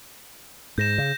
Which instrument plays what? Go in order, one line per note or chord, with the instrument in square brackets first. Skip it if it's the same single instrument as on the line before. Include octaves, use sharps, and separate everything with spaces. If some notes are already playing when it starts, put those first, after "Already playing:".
[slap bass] G#2 [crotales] G6 A#6 E7
[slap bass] C#3